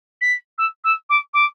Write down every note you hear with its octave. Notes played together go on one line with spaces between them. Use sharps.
B6
E6
E6
D6
D6